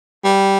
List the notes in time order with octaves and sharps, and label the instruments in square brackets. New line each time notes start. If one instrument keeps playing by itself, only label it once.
[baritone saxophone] G3